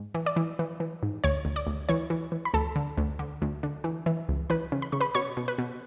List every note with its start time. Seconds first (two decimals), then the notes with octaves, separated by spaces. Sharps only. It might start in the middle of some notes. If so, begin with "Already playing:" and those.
Already playing: G#2
0.15 E3
0.26 D5 D6
0.36 E3
0.59 E3
0.80 E3
1.03 G#2
1.24 D2 C#5 C#6
1.45 D2
1.56 D5 D6
1.67 D2
1.89 E3 C#5 C#6
2.10 E3
2.32 E3
2.45 B5
2.54 D2 A4 A5
2.76 D3
2.97 D2
3.19 D3
3.42 D2
3.63 D3
3.84 E3
4.06 E3
4.29 C#2
4.50 E3 B4 B5
4.72 C#3
4.82 B5
4.92 C#3 C#6
5.01 B4 B5
5.15 B2 C#5 C#6
5.37 B2
5.48 B4 B5
5.58 B2